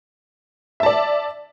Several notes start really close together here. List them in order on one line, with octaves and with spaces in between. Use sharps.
E5 A5 D5